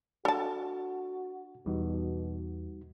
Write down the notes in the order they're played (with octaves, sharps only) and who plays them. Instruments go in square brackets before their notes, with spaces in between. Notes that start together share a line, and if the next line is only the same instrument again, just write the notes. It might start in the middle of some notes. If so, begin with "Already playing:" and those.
[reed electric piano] D4 [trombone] F#4 [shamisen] A4 A5
[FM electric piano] E2 [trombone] B2 [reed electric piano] G3 D#4 F#4